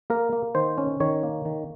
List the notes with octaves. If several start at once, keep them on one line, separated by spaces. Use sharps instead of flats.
A#3 A#4
A#3
D#3 C5
C#4
D#3 C#5
A#3
D#3